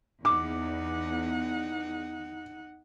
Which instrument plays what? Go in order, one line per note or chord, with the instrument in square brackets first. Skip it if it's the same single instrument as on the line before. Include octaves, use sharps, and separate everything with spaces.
[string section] E2 [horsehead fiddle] D#4 F#5 [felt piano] D6